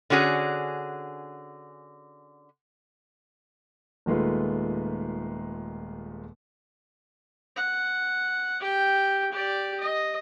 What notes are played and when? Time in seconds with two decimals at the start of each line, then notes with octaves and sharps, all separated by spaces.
0.10 D3 C#4 F#4 G#4
4.06 D#1 D#3 G#3 A3 F4 B4
7.56 F#5
8.60 G4 G5
9.32 G4 D5
9.80 D#5